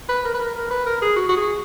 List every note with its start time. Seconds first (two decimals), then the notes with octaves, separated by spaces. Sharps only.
0.09 B4
0.25 A#4
0.34 B4
0.40 A#4
0.55 A#4
0.70 B4
0.86 A#4
1.02 G#4
1.16 F#4
1.29 F#4
1.37 G#4